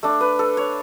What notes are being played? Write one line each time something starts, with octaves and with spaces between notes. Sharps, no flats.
A3 D4
B4
A4
C#5